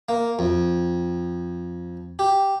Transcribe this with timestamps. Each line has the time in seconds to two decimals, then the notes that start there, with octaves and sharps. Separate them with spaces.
0.09 A#3
0.39 F2
2.19 G4